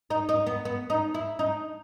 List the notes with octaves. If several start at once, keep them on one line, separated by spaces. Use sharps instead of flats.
D#4
D#4
B3
B3
D#4
E4
D#4